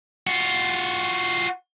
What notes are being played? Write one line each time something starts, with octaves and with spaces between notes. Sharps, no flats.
F4 F#4